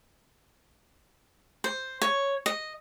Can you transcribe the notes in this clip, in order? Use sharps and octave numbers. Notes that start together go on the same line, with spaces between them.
C5
C#5
D#5